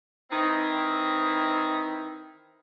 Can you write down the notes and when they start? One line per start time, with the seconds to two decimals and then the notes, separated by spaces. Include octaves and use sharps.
0.31 D#3 E3 C4 D#4 E4